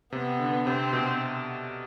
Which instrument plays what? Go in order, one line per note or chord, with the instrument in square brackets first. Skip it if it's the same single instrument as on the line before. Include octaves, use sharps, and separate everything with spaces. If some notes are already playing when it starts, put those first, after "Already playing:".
[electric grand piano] C3 [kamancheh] B3
[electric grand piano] D3
[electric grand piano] C3 [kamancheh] C4
[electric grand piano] B2